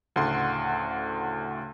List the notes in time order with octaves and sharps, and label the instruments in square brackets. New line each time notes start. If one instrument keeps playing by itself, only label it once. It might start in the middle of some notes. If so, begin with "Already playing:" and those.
[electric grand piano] D2 A2 C#3 F#5 C6